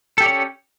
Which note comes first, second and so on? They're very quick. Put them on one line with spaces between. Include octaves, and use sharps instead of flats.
A4 G4 D5 C#5 C#4